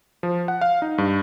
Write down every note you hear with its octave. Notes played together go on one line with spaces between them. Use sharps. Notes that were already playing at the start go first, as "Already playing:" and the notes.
F3
F#5
F5
D#4
G2